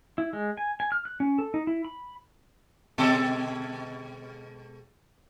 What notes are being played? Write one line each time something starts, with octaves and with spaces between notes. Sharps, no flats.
E4
G#3
G#5
G#5
F6
F#6
C#4
A4
D#4
E4
B5
B2 G#3 A4